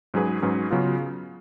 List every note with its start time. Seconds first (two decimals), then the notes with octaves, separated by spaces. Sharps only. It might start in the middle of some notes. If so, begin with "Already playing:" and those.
0.14 G#2 F#3 C#4 G#4 B4
0.42 G#2 F#3 C#4 G#4 B4
0.71 C#3 F#3 B3 F4